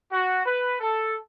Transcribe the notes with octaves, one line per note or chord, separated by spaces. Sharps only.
F#4
B4
A4